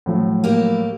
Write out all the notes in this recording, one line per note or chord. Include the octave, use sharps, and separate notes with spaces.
A2 F3 F#3
A#3 G4